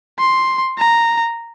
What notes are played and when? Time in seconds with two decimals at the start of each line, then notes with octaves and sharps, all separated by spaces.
0.19 C6
0.78 A#5